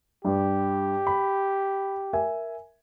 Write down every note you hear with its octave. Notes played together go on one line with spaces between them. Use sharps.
G2 G4
B5
A#4 E5 G#5